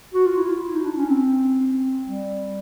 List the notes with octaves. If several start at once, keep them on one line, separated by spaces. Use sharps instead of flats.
F#4
F4
E4
F4
E4
D#4
D4
C#4
C4
G3